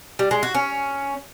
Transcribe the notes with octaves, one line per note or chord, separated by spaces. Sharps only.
G3
G#3
F#4
C#4